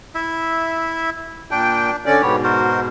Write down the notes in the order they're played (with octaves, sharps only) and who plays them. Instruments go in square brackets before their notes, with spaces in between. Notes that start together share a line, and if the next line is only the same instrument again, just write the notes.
[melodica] E4 E5
[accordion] A#2 G5 [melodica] D4
[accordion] D3 C#4 D5
[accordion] G#2 B2 [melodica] B3 G4 C#5
[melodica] F#4 A#4 C5